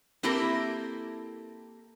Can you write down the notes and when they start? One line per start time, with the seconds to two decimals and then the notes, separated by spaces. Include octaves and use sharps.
0.23 A#3 C4 E4 G4 A4 A#4